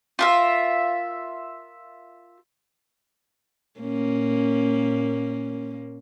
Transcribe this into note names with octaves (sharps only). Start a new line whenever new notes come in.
F4 A#4 E5
A#2 A#3 C#4